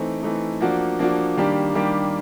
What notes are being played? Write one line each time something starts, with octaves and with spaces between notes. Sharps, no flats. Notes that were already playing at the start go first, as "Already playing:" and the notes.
Already playing: E3 A3 C4 D#4
E3 A3 C4 D#4
F3 A#3 D4 F#4
F3 A#3 D4 F#4
D#3 G3 A#3 D4 G4
D#3 G3 A#3 D4 G4